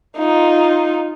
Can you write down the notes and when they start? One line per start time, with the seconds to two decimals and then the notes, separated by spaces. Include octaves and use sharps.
0.18 D#4 F4